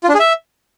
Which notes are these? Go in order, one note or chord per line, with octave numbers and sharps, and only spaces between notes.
F4
D4
G#4
E5